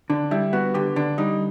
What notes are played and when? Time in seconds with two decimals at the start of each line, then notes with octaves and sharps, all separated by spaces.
0.10 D3 D4
0.31 G3 E4
0.53 B3 F#4
0.74 D3 G4
0.96 D3 D4
1.18 G3 D#4